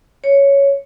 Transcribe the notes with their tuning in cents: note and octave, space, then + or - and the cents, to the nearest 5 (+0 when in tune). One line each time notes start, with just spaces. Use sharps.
C#5 +5